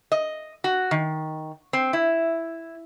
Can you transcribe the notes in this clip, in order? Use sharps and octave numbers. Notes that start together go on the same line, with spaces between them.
D#5
F#4
D#3
C4
E4